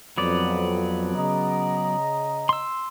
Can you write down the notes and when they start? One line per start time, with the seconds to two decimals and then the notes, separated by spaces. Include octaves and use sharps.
0.18 F2 F#3 B3 D5
1.16 C#3 D#5 A#5
2.49 C6 E6